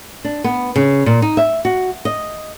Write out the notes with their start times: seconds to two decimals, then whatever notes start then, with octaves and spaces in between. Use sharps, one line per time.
0.24 D4
0.44 B3
0.76 C#3
1.06 A#2
1.22 D#4
1.37 E5
1.65 F#4
2.05 D#5